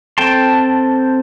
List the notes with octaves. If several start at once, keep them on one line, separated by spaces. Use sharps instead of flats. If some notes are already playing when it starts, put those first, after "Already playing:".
C4 A4 G5 A5 C6